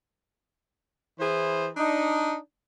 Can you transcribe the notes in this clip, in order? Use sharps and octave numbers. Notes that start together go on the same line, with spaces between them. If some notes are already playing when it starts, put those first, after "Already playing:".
E3 E4 G#4 C5
D4 D#4